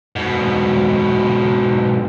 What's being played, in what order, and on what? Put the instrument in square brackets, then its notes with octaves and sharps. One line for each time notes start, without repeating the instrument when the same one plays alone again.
[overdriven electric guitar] G#2 B2